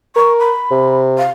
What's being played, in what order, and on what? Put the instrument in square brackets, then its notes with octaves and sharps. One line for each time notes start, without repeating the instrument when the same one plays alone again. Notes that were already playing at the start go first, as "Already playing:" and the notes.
[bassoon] A#4 [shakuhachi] C#6
[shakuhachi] B5
[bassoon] C3
[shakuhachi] F5